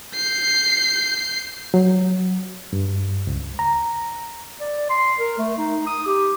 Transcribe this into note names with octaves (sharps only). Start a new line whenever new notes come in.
G6 C7
F#3
G2
C#2
A#5
D5
C6
A#4
A3
D#4
D#6
G4